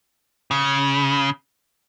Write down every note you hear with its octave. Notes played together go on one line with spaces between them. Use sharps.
C#3